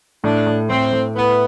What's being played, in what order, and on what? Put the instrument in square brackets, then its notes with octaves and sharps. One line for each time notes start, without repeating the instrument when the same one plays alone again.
[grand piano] A2 [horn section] D4
[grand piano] A2
[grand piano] A2 [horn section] C4
[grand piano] A2
[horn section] B3 [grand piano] E4